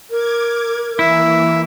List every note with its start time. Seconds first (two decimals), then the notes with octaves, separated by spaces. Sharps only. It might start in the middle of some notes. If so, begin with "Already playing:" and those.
0.10 A#4 D6 G#6
0.99 E3 A#3 E4 E5